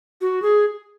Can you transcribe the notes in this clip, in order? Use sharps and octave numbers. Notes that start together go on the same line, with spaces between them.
F#4
G#4